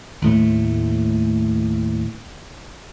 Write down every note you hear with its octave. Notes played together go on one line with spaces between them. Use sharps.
D#2 A2 A3